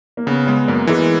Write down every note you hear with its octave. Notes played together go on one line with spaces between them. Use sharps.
A#3
C#3 B3
G#3 B3
F#2 A#3
E3 G#3